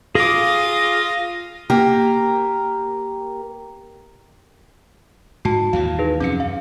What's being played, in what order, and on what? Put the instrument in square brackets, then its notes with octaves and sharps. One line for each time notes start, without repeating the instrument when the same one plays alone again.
[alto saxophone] F4 [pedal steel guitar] G#4 D6 [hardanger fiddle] F5 D#6 [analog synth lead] A#6
[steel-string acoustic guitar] A#3 G4 A#4
[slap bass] G#2 [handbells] F#4 A5
[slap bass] D#2 A#2 E3 [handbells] F5
[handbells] D#4 G#4 B4
[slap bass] F2 C3 F#3 [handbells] C#4 C#7
[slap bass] F#2 [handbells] F5